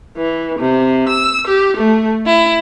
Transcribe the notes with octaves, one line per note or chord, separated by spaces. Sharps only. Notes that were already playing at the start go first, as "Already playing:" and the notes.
E3
C3
E6
G4
A3
E4